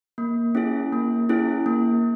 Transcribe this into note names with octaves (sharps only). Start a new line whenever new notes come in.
A#3
C#4 E4 G#4
A#3
C#4 E4 G#4
A#3